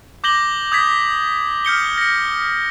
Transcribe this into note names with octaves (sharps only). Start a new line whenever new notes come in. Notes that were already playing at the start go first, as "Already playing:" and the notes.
D6 G6 A#6 F#7 G7
D#6 G6 G#6 B6
F6 G6 C#7 G7
A#6 C#7